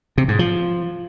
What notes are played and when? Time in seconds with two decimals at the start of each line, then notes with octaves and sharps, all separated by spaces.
0.18 C3
0.28 G#2
0.39 F3